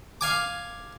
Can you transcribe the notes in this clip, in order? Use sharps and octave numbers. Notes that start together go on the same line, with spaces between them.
F5 G#5 D6